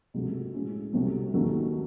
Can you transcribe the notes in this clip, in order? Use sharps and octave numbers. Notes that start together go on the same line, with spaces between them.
C#2 C3 F#3 A3
A2 G#3 C#4
C2 C3 F#3 A3 C4
D#2 D#3 F#3 A3 C#4